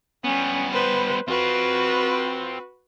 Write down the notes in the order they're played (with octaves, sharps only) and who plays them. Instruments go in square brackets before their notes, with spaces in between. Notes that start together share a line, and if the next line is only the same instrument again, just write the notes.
[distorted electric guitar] G3 B3 [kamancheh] C#4
[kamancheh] B4 C5
[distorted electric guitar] C4 F4 [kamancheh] F#4 B4